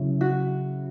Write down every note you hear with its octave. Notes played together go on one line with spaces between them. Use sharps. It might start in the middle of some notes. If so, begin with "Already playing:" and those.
Already playing: C#3 F#3 C#4 E4
F#4